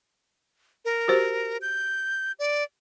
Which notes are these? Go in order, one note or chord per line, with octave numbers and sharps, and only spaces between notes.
A#4
F#4 G4 C5
G6
D5